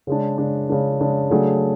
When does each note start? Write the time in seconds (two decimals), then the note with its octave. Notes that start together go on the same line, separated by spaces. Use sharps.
0.07 C#3 G#3 D4
0.38 C#3 G#3 D4
0.69 C#3 G#3 D4
1.01 C#3 G#3 D4
1.30 C#3 F#3 A3 D4 G#4